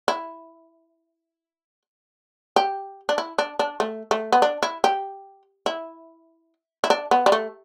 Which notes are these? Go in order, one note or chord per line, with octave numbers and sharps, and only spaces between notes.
E4
G4
D4
E4
D4
D4
A3
A3
B3
D4
E4
G4
E4
E4
D4
B3
G3
A3